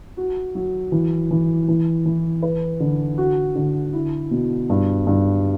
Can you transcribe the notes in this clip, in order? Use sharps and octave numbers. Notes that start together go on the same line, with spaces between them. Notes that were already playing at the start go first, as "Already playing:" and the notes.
F#4
F#3
E3
E3
E3
E3
B4
D3
F#4
D3
E4
B2
G2
G2